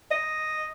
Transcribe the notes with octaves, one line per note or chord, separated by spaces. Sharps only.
D#5